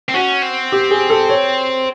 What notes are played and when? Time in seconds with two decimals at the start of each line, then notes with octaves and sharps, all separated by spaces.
0.09 C4
0.14 C#4 F#4
0.42 C4
0.72 G4
0.91 G#4
1.10 A4
1.30 C#5